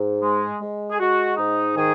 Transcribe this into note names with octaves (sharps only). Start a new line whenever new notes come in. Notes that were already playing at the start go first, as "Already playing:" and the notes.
Already playing: G#2
G#3
G#3
G#4
G#3 F#4
G#2 D#4
D#3 G#4